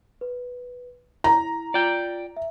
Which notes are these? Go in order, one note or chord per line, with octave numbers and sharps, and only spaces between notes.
B4
E4 A#5
F4 D5 G5
E5